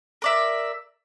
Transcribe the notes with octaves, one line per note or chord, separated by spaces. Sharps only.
A#4 D5 E5